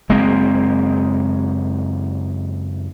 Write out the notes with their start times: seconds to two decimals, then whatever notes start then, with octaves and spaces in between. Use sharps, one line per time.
0.09 F#1 G#3 A#3 C4